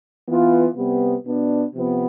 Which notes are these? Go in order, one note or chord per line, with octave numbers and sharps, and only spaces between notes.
E3 B3 F4
C3 G3 B3
B2 B3 D4
C3 F3 B3